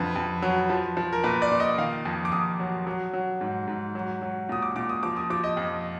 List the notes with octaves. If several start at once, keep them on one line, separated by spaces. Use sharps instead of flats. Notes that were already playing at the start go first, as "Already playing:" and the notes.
Already playing: F2 D3 B4
F2
F#3
F3
F3
A#4
A#2 B4
D5
A#2
D#5
D#3 F5
F2
D6
F2 D#6
F#3
F#3
F#3
G#2
G#2
F#3
F#3
A#2 D#6
D6
A#2 D6
D#6
F3 D6
D#6
F3 D6
D#5
F2